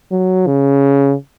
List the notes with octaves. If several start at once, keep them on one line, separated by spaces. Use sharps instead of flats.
F#3
C#3